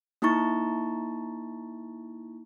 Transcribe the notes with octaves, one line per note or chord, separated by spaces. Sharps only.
A#3 D#4 E4 A#5 C#6 A6